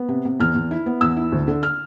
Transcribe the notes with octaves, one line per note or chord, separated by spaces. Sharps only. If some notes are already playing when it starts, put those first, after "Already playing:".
Already playing: B3
C3
C3
E2 F6
E2
E4
B3
E2 E6
E4
D2
D3
F6